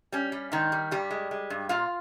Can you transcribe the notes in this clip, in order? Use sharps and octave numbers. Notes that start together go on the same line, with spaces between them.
G3 C#4
G3
G#2 D#3 D#4
G3
G2 G3 G4
G#3
G#3
G2
A#2 F4 F5